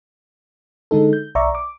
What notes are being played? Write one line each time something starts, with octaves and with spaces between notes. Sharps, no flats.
D3 G#3 D#4 A4
G6
B1 D5 E5 A#5 C#6
D6